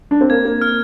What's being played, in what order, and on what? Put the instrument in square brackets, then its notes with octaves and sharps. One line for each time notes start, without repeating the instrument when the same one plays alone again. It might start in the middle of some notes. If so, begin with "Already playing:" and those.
[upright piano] D4
C4
[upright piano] A#3 [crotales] G#6
[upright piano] A#3
[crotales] F6